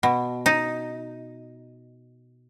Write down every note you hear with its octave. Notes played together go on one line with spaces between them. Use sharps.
B2
D#4